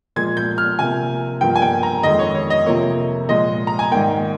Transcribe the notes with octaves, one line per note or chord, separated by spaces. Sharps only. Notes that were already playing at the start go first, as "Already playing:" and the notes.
A#2 F3 G#3 G#6
G6
F6
C3 F3 A#3 G#5
G2 F3 A#3 G5
G#5
G5
A#5
F2 D#3 G#3 D#5
C#5
C#5
D#5
C3 F3 A#3 C#5
A#2 F3 G#3 D#5
A#5
G#5
G#2 D#3 G3 A#3 G5